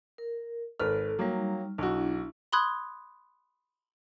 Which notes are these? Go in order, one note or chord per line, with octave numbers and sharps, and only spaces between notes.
A#4
G#1 A4 B4 F6
F#3 G3 A#3 D#4
B1 D4 E4 F#4
B5 C6 D#6 F#6 G#6